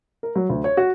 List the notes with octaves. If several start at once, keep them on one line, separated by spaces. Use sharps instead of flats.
A#4
F#3
D2
C#5
F#4